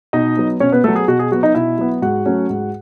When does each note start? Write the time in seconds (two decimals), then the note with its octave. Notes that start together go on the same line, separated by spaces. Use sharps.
0.13 B2 D#4 D#5
0.37 F#3 B3
0.60 B2 C#4 C#5
0.72 B3 B4
0.84 F#3 A3 B3 A4
0.96 G#4
1.08 B2 F#4
1.19 G#4
1.31 F#3 B3 F#4
1.43 D#4 D#5
1.55 B2 E4 E5
1.78 F#3 B3
2.02 G#2 F#4 F#5
2.26 F#3 A3 C#4
2.50 G#2